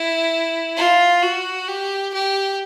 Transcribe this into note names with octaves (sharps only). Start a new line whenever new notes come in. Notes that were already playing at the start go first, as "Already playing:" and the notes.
Already playing: E4
F4
F#4
G4
G4